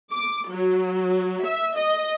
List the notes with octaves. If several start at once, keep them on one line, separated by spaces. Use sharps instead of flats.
D6
F#3
E5
D#5